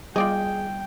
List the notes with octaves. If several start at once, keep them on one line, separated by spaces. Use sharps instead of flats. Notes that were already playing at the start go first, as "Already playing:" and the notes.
G3 F4 G#4 D5 D#5 G5